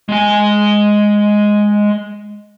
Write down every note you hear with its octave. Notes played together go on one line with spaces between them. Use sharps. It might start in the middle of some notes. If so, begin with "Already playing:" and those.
G#3 G#5